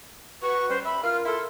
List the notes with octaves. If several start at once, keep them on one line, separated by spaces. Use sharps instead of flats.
F#4 B4 C#6
G3 C#4 C5
E5 B5
F4 A#4 F6
E4 A4 C6